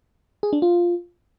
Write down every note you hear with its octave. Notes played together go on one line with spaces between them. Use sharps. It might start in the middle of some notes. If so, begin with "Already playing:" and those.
G#4
D4
F4